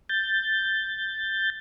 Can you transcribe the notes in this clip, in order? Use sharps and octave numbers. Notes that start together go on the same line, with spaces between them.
G6 A6